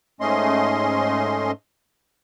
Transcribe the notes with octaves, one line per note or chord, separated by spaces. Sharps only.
G#2 A3 C#4 D#5 C6